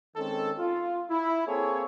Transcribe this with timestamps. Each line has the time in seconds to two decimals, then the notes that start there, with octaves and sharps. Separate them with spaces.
0.17 D#3 G#3 C4 C#4 A4
0.58 F4
1.10 E4
1.48 A#3 C4 G#4 A4 C5 C#5